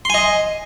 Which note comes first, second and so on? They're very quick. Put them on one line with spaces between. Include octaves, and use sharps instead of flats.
C6 G#5 D#5